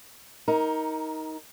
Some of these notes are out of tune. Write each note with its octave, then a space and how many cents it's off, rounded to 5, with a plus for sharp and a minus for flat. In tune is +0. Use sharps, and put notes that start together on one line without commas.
D#4 +20 A#4 +0